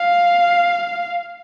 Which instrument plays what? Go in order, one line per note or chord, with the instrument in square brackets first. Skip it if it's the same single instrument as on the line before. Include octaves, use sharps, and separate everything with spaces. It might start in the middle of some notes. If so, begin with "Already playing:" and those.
Already playing: [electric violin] F5